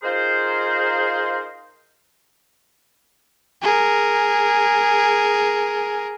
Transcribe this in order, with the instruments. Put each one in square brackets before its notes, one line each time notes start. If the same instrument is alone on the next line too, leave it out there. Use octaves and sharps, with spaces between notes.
[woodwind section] D#4 F4 G#4 A#4 C5
[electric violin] G#4 A#4